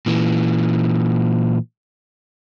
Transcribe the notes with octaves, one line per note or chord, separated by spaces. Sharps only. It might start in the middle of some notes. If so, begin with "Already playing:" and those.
A#2 E3